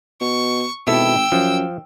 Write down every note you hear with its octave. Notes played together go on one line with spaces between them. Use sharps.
B2 C#6
G#1 B2 E4 A4 G5 E6
F#2 F3